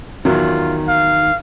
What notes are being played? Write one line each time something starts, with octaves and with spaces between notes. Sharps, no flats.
E2 D#3 F#3 F4
F5